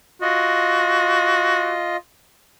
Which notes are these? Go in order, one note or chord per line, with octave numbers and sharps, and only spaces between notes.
F4 F#4 D#5